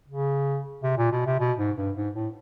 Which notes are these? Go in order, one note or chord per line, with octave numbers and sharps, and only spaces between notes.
C#3
C3
A#2
B2
C3
B2
G#2
G2
G#2
A2